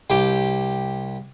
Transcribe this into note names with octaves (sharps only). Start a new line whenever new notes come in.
C2 G4